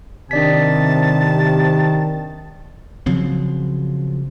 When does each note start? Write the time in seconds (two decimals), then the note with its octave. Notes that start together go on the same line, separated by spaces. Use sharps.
0.31 C3 D#3 D4 D5 A5 B6
3.06 C#3 F3 F#3 C4